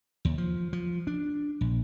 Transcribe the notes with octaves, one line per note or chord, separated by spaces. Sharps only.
D#2
F3
F3
D4
A#1